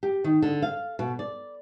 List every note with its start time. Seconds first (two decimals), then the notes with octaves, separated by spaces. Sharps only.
0.03 G4
0.24 D#3
0.42 D3
0.62 F5
0.99 B2
1.19 D5